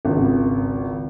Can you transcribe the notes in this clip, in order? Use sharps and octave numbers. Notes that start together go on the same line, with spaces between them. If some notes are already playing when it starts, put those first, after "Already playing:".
G#1 C#2